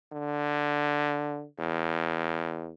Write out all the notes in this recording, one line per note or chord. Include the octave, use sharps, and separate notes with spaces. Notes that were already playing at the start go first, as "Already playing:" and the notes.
D3
E2